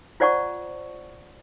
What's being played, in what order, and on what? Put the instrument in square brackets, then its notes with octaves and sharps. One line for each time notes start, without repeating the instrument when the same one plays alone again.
[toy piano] F4 C5 D5 F#5 A5 C#6